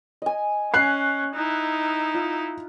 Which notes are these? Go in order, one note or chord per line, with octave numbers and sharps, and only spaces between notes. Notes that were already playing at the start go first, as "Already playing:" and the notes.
D#5 G#5
C#4 F#6 C7
D#4 E4
F4